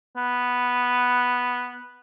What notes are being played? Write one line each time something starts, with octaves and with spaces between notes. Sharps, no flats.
B3